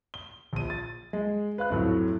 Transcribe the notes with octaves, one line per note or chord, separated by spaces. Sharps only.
G7
A#1 D#7
A6
G#3
B4 F5 F#6
F2 A2 F#3